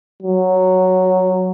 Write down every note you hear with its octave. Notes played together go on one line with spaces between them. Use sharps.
F#3